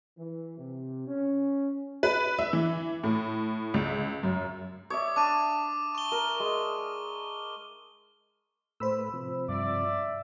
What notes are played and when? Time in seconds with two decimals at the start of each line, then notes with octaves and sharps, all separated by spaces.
0.18 E3
0.58 C3
1.08 C#4
2.03 B4
2.38 E5
2.53 E3
3.03 A2
3.74 C#2
4.23 F#2
4.90 C#5 D5 E5 D#6
5.16 D4 D6 D#7
5.95 C#6 G7
6.12 A#4
6.40 G#3
8.80 A2 A3 B4 C5 B5 E6
9.14 C3 F3
9.49 G2 D5 E5